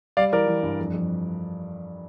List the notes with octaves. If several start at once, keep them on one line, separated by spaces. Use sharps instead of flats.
G3 D5 F5
E3 A#4 D5
E3
G2
F2
F2